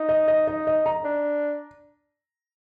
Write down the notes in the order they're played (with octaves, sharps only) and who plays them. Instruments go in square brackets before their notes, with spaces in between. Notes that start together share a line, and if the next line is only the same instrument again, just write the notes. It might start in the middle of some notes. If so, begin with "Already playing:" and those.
Already playing: [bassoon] D#4
[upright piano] D#5
D#5
D#5
D#5
A#5
[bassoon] D4